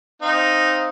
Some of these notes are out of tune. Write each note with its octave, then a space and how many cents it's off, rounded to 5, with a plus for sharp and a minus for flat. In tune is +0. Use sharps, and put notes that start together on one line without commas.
C4 +0 D#4 +0 F5 +0